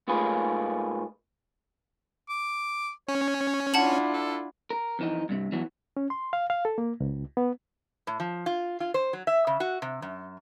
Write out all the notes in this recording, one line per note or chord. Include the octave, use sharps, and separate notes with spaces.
G#2 A3 A#3 F4 G#4 B4
D6
C#4 C#5
D4 E4 F4 F#5 A5 F#7
A4
A#4
F2 E3 D#4
G2 C3
E3 F#3 B3
C#4
C6
F5
F5
A4
A#3
C#2
B3
A2
F3
F4
F4
C5
F#3
E5
C#3
F#4
C3
F#2